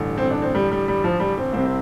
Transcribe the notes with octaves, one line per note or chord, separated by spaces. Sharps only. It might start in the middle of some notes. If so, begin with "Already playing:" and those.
Already playing: A1 G2 D3
C4
D4
C4
G3
G3
G3
F3
G3
C4
C2 C3 C4
C4